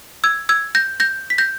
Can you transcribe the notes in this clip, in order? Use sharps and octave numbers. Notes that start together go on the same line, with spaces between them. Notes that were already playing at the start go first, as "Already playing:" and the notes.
E6 G#6
E6 G#6
G6 A#6
G6 A#6
B6
G6 A#6